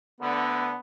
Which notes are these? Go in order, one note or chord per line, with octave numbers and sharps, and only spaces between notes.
D2 D3 B3